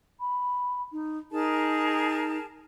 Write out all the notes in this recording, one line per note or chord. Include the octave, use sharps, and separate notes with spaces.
B5
D#4
D#4 G#4 A#4 A5